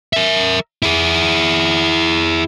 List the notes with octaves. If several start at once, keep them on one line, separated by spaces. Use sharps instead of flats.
A#4 E5
E4 G#4